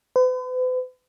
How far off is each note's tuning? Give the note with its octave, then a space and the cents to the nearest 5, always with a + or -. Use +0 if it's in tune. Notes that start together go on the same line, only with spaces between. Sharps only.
B4 +45